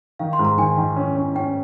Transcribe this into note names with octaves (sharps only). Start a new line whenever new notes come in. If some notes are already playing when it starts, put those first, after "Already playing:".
D#3 F5
C6
G#2
A#5
D#3 G#5
D#3
C#4
C#4
C#4 G5